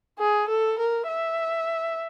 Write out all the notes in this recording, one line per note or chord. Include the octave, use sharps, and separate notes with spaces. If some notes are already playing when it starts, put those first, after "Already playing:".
G#4
A4
A#4
E5